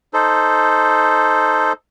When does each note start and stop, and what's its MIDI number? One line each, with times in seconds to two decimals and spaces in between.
0.14 1.73 63
0.14 1.73 69
0.14 1.73 72